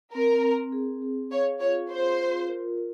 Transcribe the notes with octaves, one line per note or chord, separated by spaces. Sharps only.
C4 A#4
C4
G#4
G#4
C#5 F5
F4 C#5
F4 C5
F4
A#4
A#4